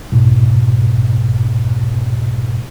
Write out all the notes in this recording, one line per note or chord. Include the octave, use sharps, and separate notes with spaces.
B1 F2 G#2 B2